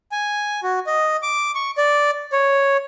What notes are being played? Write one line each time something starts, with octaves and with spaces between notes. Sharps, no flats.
G#5
F#4
D#5
D6
C#6
D5
C#5